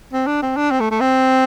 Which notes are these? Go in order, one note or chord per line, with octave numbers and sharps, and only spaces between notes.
C4
D4
C4
D4
C4
A3
A3
C4